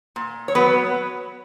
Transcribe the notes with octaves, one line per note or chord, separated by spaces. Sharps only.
A#2
C#5
F#3 B3 B4